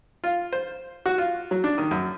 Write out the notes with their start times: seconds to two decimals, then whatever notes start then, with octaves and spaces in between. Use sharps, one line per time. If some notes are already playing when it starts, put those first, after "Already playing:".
0.24 F4
0.53 C5
1.06 F#4
1.18 F4
1.51 F#3
1.64 D4
1.78 D#3
1.91 F#2